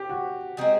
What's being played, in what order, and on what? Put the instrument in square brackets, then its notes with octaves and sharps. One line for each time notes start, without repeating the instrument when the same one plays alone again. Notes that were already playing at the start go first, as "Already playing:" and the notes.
Already playing: [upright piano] G4
F#4
[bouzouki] G#3 C4 D#4 G#4